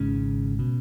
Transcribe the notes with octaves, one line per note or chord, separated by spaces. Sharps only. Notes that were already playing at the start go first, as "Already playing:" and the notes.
Already playing: G#1 G#2 C#3 C#4
B2